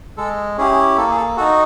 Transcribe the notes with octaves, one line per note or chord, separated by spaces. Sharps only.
G#3 A4
C#4 E4 G4 G#4
A#3 A4
G#4
A4
D#4 F#4 A4